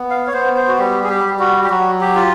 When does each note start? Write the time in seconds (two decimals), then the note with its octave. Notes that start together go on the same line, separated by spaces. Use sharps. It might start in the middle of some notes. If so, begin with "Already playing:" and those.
Already playing: B3
0.10 F5
0.27 C#5
0.33 B3 C5
0.56 C5
0.68 F#4
0.78 G3 G4
1.03 G#4
1.09 G4
1.24 G3
1.39 F#4
1.64 G4
1.70 F#3 F#4
2.01 G4
2.15 F4